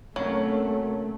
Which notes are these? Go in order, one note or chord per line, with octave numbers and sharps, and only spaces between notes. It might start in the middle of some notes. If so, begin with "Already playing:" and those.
C2 F#3 A3 A#3 C#4